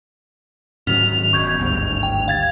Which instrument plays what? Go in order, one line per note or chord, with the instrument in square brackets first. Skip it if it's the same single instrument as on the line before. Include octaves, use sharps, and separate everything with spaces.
[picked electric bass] G#2 D#3 F#3 [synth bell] C#4 [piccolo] F7
[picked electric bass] E1 B2 [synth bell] C#6 G6 G#6 [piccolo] F7
[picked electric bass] G#1 D2 G2
[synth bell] G5
F5 G#6 A6